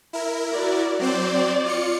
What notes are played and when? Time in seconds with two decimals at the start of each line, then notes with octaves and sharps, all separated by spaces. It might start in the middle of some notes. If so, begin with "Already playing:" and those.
0.13 E4 A#4
0.52 F#4 D5
0.99 F#3 C4 C5 D5
1.66 F4 C#7